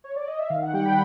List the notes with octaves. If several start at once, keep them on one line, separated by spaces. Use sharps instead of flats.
C#5
D5
D#5
E5
D#3 F5
F#5
G3 G5
B5